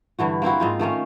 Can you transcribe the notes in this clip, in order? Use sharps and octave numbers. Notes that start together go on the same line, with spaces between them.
G2 D3 E3 F#4
A#3 C4 E4 F#4
G#2 D#4 F4
D#3 A3 A#3 C#4